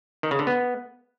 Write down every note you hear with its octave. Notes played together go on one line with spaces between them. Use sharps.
D#3
C#3
D3
B3